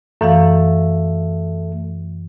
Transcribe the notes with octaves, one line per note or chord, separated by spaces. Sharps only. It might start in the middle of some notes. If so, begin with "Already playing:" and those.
F#2 E3 A3 F5